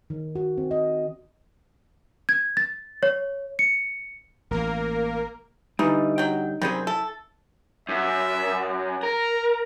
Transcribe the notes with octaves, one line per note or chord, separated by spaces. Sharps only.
D#3
F#4
C4
D#5
G#6
A6
C#5
C#7
A1 A#3 A#4
D3 E3 G3 D#4
F#3 G5
F#2 C3 D#3 G3 C4 G#4
E4 A4
F#2 E5
A#4 A#5